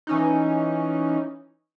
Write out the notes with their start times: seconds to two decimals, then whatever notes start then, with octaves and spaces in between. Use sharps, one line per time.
0.07 E3 C#4 D#4